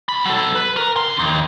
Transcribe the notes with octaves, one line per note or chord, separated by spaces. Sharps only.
C2 B5
F#3 A4
B4
A#4
D3 C6
D#2